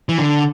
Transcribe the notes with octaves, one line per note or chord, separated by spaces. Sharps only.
E3
D3